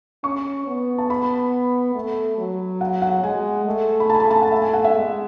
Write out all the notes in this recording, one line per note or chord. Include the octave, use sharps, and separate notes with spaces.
C#4 C#6
B3
A5
B5
A3
F#3
F#5
F#5
G#3 G#5
A3
B5
A5
G#5
A5
A5
F#5
E5
G#5
F#5
E5
G#3